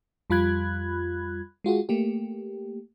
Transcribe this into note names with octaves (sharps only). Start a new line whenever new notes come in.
F2 G3 F4 B5 F#6 G#6
G#3 F4 F#4 G#4
A3 A#3 G4